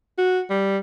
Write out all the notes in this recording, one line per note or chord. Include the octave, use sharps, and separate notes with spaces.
F#4
G3